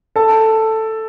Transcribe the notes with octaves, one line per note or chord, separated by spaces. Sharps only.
A4 A5